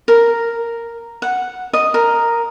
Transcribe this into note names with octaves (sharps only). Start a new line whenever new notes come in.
A#4
F#5
D#5
A#4